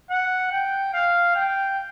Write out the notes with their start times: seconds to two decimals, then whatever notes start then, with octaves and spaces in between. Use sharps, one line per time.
0.11 F#5
0.52 G5
0.94 F5
1.35 G5